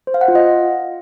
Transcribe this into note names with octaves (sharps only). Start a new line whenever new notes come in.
C5
F5
F#5
F4
D#5